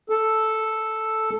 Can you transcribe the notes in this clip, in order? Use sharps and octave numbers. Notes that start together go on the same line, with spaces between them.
A4